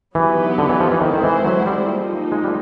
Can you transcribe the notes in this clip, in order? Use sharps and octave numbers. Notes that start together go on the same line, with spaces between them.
E3 F#3 B3 D#4 G4
D3
E3
F3
E3
D#3 G#3 C4 E4 A4 C5
D#3
E3
F#3
G3
F3 A#3 D#4
G#3
G3